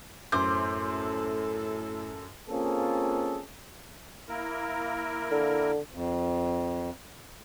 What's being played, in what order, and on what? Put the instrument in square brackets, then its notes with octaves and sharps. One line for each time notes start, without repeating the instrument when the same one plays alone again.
[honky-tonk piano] F#2 D6 G6 [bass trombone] A2 [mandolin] C5
[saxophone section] A4
[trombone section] A#3 C4 C#4 F4 G#4 A4
[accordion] A#3 E4 A#4
[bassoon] D3
[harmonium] F2